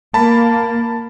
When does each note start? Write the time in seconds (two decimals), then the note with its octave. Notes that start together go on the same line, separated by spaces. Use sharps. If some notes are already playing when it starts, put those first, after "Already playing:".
0.14 A#3 A5 B5